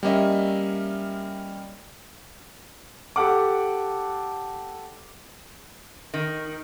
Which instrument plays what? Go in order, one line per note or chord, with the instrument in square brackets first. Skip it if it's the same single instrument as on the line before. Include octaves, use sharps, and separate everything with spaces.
[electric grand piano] G3 A#3 C#4 D#5 E5
[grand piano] G4 A4 F#5 D6
[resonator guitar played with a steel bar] D#3